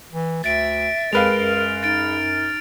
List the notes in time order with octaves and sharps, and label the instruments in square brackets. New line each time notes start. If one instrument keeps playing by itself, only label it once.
[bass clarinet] E3
[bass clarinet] D2 [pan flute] E5 [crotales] A6 D7
[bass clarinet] F2 [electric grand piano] G#3 B4 F5 [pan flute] A#4 [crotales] F6 F7
[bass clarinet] F#2
[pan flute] D#4 [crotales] A6 D7